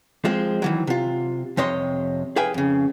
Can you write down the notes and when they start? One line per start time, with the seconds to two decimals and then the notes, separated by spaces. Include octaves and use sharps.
0.25 F3 G#3 C4
0.62 D#3 E3 F#3
0.87 C3 F4
1.57 F2 C3 C#5 D#5 C6
2.36 G#4 B4 F5 G5 G#5
2.54 F2 C#3